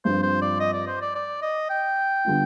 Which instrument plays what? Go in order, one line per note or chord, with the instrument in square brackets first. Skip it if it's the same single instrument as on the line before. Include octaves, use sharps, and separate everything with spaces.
[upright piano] G2 F3 C4 F4 [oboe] C5
[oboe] C5
D5
D#5
D5
C5
D5
D5
D#5
G5
[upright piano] D3 G3 B3 F4